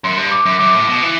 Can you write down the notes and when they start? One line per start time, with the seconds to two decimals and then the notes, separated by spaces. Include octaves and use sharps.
0.04 F#2 C6
0.17 G2
0.31 D6
0.46 F#2
0.59 F#2 D6
0.74 A2
0.89 B2
1.02 E3